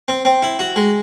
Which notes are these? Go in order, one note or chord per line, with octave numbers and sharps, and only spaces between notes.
C4
C4
E4
F#4
G#3